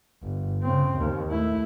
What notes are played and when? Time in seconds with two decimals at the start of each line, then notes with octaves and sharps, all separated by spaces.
0.23 G1
0.63 C#3 C4
0.97 D#2
1.30 A3 E4